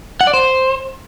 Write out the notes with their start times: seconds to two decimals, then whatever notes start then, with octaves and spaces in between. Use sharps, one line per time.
0.21 F#5
0.27 D5
0.34 C5